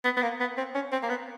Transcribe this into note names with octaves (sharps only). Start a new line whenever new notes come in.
B3
B3
A#3
B3
C4
C#4
C4
A#3
B3